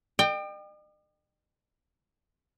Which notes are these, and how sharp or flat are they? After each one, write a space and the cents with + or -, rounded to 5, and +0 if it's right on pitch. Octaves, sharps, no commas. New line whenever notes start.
D#5 -45 G5 +10